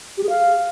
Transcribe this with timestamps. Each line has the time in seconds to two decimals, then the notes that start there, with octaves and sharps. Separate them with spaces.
0.17 G4
0.23 G#4
0.29 F5